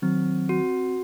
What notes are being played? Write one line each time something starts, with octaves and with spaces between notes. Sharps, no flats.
D#3 F#3 C4
F#4